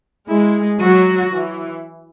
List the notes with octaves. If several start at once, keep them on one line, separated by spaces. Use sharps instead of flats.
G#3 E4
F#3 F#4
E3